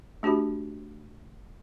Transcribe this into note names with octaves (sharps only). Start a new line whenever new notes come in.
A3 D4 F#4 G4 B5